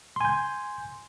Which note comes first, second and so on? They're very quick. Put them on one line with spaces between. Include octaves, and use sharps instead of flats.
C6 G#5 G6